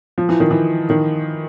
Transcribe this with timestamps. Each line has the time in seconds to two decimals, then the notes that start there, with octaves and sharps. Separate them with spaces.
0.18 F3
0.29 E3
0.40 D#3
0.51 E3
0.90 D#3